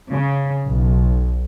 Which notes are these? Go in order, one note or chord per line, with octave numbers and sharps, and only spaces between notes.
C#3
B1